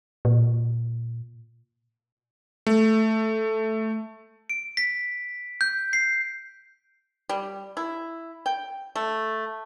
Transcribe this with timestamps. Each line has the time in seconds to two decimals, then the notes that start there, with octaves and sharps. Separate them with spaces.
0.25 A#2
2.67 A3
4.50 D7
4.77 B6
5.61 G6
5.93 C7
7.29 G3
7.77 E4
8.46 G5
8.95 A3